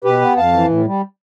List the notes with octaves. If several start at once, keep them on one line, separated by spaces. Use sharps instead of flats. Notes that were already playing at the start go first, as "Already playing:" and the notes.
B2 G4 B4
B3
F2 F5 A5
E3
A2
G3